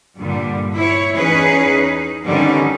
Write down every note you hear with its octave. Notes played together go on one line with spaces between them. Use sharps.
G2 A#2 D3 G3
E4 C#5
E2 C#4 D#4 G#4 B4
D#4
D3 D#3 G3 B3 C#4 D#4